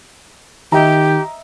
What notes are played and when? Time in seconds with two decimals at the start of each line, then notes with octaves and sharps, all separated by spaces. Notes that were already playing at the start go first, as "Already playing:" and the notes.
0.72 D#3 G4 D#5 E5 A#5